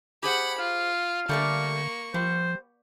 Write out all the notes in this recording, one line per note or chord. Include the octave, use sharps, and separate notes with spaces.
G4 G#4 C5 F#5 B5
F4 F5
D3 G3 A3 A#3 D5 C#6
F3 G3 C5